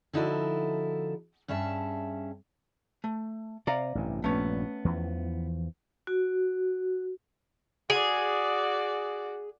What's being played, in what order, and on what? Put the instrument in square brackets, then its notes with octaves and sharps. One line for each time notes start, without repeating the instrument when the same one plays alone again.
[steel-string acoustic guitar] D3 F3 D#4 E4 F#4 A4
G2 C#4 G#4 E5 A5
[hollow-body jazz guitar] A3
[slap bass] C3 [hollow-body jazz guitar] D5 F5 A#5
[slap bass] A1 G2 C3
[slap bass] A#1 G2 [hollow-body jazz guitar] A3 B3 C#4
[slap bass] E2 E3 F3
[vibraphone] F#4
[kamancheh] F#4 D5 [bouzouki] G#4